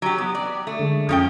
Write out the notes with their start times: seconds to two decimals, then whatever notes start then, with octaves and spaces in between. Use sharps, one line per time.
0.02 F#3 G4
0.18 B3 D#6
0.35 D5
0.67 A3
0.79 D3 G#3
1.09 F2 F3 C#4 G5